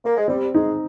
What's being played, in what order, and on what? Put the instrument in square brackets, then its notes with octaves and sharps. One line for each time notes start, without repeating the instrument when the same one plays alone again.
[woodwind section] A#3
G#3
[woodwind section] G3 [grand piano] C4
[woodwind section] G#3 [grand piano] D#4